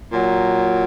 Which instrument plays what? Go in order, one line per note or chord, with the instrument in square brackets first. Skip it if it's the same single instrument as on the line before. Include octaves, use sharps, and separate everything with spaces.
[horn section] A#2 F#3